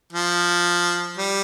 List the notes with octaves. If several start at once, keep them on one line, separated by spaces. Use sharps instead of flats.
F3
G3